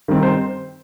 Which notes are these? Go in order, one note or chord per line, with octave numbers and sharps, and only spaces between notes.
D#3 G3 C4
C5